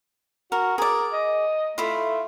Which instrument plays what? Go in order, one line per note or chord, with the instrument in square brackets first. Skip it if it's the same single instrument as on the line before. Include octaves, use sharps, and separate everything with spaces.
[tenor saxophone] F#4 [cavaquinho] A#4
[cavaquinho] G#4 D5 [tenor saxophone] A#4
[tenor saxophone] D#5
[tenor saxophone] A3 [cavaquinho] E4 F4